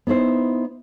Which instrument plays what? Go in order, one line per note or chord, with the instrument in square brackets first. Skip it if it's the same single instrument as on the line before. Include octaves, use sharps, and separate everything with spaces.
[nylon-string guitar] B3 D#4 E4 C5